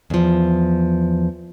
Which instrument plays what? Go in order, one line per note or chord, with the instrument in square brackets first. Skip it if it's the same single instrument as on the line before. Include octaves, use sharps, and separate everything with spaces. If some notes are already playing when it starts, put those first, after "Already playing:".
[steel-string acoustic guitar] E2 F3